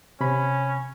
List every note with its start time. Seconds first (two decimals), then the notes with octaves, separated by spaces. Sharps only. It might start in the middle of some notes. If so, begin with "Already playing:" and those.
0.21 C3 C#4 B5